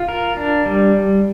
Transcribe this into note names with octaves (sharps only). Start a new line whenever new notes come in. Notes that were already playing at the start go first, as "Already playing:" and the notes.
Already playing: F4
A#4
D4
G3